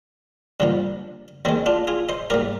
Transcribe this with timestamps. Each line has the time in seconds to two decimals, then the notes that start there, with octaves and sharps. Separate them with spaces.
0.60 G2 D3 F3 A#3
1.45 D#2 D#3 G#3 C4
1.66 D4 F4
1.87 F4 G#4
2.09 C5 D#5
2.30 G#2 G3 A#3 A#4 D5